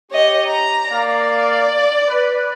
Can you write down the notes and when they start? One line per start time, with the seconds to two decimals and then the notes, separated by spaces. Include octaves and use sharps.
0.11 G4 C#5 D#5
0.48 A#5
0.90 A#3 D5 F5
2.08 B4